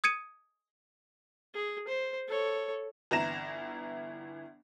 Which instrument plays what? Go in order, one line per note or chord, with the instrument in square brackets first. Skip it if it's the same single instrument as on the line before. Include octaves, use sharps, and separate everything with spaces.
[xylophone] D#6 G#6 C#7 D#7
[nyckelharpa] G#4
C5
A4 C#5
[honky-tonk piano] G1 E3 E4 A#5 A#6 E7